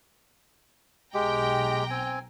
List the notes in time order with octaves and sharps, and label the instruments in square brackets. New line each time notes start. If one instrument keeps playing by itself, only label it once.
[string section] B1 G5 A#5 [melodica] G#3 G4
[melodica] C4 G#5